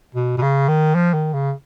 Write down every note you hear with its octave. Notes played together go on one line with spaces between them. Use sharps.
B2
B2
C#3
D#3
F3
D#3
C#3